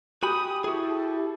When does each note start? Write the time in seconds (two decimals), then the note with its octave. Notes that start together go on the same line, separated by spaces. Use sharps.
0.23 F#4 G4 G#5 B5 D#6
0.64 E4 F#4 G#4 A4